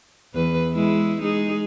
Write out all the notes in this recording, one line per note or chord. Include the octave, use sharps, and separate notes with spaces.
E2 B4
G#3 E4
G#3 D#4 G#4